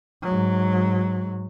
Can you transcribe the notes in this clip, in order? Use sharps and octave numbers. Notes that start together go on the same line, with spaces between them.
G#2 F#3